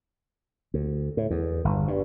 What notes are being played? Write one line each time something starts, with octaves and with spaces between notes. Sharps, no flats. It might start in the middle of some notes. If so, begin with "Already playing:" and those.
D2
A2
E2
G1
G2